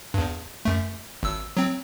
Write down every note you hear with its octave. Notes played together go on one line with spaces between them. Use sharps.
E2 G2
F#2 A3
G#1 E6
F#3 C4